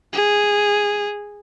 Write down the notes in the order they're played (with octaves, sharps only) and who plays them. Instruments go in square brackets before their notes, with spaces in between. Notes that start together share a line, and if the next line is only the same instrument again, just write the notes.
[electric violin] G#4